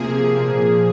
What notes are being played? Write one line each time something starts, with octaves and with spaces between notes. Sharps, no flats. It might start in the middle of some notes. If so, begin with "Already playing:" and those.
Already playing: C3 F3 A#3 G#4
A#2 F3 A#3